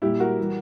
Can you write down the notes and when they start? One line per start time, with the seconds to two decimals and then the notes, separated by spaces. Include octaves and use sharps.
0.02 A#2 G3 E4 G4
0.20 F#4 A#4
0.39 E3 G3